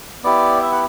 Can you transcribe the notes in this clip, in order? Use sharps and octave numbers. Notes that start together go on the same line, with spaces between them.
B3 E4 G4 D5
E5
F#5